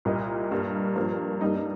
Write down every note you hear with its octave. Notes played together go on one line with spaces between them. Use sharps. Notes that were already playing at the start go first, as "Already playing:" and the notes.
C2 A#2 A#3 A#4 D#5
G2 G3 A#3
G2 F3 A#3
G2 G3 A#3 D#4
D#4